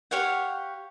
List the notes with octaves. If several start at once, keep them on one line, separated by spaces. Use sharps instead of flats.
G4 C#5 F5 F#5